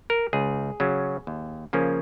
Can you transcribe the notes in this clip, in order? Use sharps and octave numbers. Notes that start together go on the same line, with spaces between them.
A#4
C#2 G#4
C#3 F#3 C#4
D#2
C#3 F3 A#3 C#4